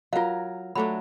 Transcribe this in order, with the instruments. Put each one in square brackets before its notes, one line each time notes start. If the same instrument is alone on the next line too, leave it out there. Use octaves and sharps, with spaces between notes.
[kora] F#3 A#4 [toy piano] F4 F5
[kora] F#3 A3 D4 [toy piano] B5